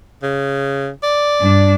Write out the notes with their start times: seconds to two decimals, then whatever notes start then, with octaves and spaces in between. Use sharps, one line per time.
0.23 C#3
1.03 D5
1.41 G2 D4